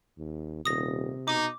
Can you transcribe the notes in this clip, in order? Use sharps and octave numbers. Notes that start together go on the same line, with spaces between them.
D#2
D#1 C3 D#6 A#6
B2 D#4 D6